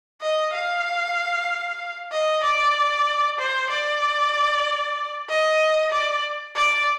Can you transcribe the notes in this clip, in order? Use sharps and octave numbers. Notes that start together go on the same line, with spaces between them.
D#5
F5
D#5
D5
C5
D5
D#5
D5
D5